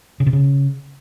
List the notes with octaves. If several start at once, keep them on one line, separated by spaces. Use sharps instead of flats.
C#3
C3
C#3